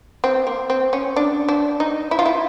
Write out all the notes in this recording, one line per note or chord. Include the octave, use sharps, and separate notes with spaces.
C4
A#3
C4
C#4
D4
D4
D#4
E4
F4
E4